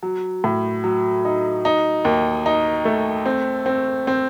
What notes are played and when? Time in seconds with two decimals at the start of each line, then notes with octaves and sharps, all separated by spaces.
0.03 F#3
0.44 A2
0.84 F#3
1.25 D#4
1.65 D#4
2.05 D#2
2.46 D#4
2.85 A3
3.26 C4
3.66 C4
4.07 C4